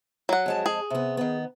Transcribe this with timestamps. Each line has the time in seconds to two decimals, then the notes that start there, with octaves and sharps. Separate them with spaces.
0.29 F#3 F#5
0.46 F2 G#3 A5
0.66 G#4
0.90 C3 B3
1.17 D#3 B3